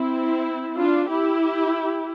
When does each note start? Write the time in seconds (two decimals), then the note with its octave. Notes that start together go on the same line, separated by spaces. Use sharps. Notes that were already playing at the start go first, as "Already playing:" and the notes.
Already playing: C4 E4
0.77 D4 F4
1.08 E4 G4